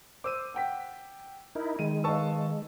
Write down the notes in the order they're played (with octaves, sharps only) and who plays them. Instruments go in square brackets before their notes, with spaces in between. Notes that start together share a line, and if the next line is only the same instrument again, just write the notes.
[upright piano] C5 [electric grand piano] D6 E6 D#7
[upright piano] F#5 G5 B6
[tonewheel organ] D#4 E4 [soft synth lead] A#4
[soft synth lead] D#3 [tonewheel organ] G#3 [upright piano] D#7
[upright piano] B4 D#5 F5 [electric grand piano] A5 C#6 E6